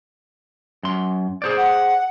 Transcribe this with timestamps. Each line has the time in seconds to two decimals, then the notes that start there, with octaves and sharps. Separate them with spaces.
0.83 F#2 C6
1.42 G#4 C5 D5
1.57 F#5